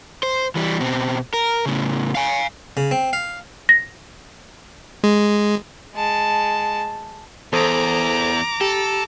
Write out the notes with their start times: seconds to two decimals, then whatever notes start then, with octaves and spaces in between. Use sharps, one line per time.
0.23 C5
0.55 E3 G3
0.80 B2 C4
1.34 A#4
1.66 A2 C#3
2.15 F5 G#5
2.77 C#3
2.91 C4
3.13 F5
3.69 A#6
5.04 G#3
5.95 G#3 A5
7.53 E2 A4 C5 A#5 D6 D#6
8.61 G4 A4